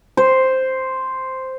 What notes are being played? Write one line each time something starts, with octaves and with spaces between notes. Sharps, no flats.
C5